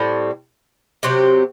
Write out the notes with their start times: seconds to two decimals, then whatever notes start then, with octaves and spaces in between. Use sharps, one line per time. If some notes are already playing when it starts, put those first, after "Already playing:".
Already playing: A2 G3 C4
1.03 C3 F#3 C4 G4